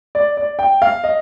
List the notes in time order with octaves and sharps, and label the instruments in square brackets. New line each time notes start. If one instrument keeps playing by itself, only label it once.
[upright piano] D5
D5
G5
F5
D#5